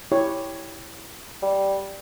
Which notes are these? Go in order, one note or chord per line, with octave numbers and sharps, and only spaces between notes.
E4 G4 C#5
G3